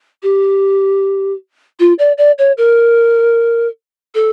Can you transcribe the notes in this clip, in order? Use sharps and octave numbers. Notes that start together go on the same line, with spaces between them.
G4
F4
D5
D5
C#5
A#4
A4